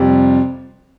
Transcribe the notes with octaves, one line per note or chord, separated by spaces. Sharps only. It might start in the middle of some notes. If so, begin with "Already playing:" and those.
Already playing: F2 C3 G3